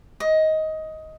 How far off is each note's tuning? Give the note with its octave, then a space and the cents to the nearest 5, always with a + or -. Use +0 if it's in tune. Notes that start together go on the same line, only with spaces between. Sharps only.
D#5 +15